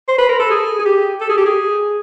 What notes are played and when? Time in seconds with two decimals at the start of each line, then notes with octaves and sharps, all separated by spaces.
0.08 C5
0.18 B4
0.29 A#4
0.39 A4
0.50 G#4
0.79 G#4
0.85 G4
1.21 A4
1.29 G#4
1.37 G4
1.45 G#4